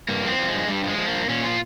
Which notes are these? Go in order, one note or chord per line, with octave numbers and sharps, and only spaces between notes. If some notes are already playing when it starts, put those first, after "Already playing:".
G2 A#3
F3 C4
F3 G3
G#3
G2
G2 G3
F3 G#3
F3
A#3
G2
A#2 C#4
F3 F4